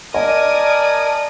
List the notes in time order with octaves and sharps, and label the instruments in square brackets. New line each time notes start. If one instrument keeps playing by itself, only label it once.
[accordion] A#4 G#5 [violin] D5 D#6 [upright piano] D#5 [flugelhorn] A5